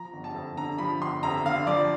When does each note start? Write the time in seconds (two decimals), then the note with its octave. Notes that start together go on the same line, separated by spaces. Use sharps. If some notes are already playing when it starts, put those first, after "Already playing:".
Already playing: F3 A#5
0.13 G1
0.24 A5
0.34 F2
0.57 D3 A#5
0.78 F3 B5
1.00 G1 C6
1.23 F2 A#5
1.45 D3 F5
1.67 F3 D5